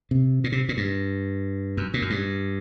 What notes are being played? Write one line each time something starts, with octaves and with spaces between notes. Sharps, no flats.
C3
A#2
C3
A#2
G2
F#2
A#2
F#2
G2